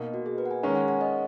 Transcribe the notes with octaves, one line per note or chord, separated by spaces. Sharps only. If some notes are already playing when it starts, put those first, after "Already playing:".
Already playing: B2 A#3 D#4
F#4
G#4
B4
F#5
G#5
D#3 G#3 C#4 A#5
G#5
F#5
F#5
D#5